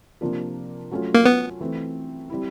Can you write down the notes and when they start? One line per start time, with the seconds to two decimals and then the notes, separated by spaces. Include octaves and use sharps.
0.21 C3 F3 A#3 D4 F4
0.91 F#3 A3 C#4 F4
1.14 A#3
1.25 B3
1.60 E3 A3 C4
2.30 G3 C4 E4